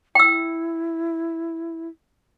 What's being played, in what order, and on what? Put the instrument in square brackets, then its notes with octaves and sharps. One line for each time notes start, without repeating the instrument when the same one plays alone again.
[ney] E4 [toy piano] G5 E6